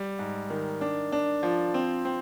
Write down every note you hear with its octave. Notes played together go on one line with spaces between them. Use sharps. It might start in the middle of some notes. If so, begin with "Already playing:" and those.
Already playing: G3
G#2
D#3
D4
D4
F3
C4
C4